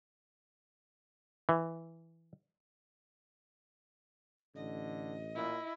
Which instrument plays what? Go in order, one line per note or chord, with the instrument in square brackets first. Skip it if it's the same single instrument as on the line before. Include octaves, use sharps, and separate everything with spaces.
[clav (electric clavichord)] E3
[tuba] A1 [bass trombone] D3 [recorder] D#5
[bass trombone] A#2 [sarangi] E4